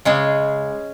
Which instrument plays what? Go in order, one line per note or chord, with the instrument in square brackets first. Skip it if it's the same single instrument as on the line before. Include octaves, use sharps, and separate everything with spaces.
[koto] C#3 G#3 C#4 G#4